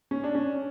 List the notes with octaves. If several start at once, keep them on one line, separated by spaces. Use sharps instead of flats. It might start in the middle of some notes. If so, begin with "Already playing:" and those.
C#4
D4
C#4